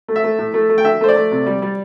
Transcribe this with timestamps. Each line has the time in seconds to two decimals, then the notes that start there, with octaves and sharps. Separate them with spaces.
0.08 A3
0.16 E5
0.24 A3
0.39 A2
0.54 A3
0.69 A3
0.78 G5
0.84 D3 E5
1.01 A3 C5
1.09 D5
1.16 A3
1.32 C3
1.46 G3
1.62 G3